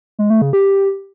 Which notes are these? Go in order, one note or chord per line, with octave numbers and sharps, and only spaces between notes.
G#3
A3
C#3
G4